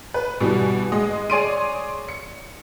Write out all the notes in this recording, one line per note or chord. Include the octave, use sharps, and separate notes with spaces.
B4
B2 E3 G3
G#3 D#5
G#4 C#5 D5 C6 D7 D#7
C#7